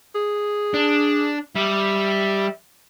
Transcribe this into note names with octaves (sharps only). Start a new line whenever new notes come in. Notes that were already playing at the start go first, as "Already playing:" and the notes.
G#4
D4
G3 E5